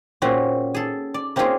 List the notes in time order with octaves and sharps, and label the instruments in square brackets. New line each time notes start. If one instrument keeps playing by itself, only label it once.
[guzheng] A#2 C4 C#4 F#4 G#4
G#4 A4
D5
A#3 C4 C#4 D#4 F4 G#4